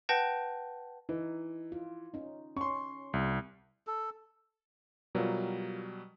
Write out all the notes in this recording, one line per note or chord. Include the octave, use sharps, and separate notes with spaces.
B4 F#5 G5 A5 G6 A#6
E3 D#4
F4
C#4 D#4
C#4 C6 C#6
C2 G3
A4
B2 F#3 G3 F4 A#4